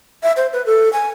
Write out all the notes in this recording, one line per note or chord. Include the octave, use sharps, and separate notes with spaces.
E5
C5
B4
A4
G#5